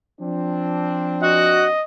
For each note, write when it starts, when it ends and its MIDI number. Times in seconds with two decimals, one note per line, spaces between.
0.20 1.79 53
0.20 1.79 60
0.20 1.79 62
1.23 1.63 66
1.23 1.84 75
1.23 1.63 78